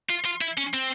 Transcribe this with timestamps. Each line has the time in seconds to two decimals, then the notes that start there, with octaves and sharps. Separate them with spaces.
0.09 F4
0.25 F4
0.41 E4
0.57 C#4
0.74 C4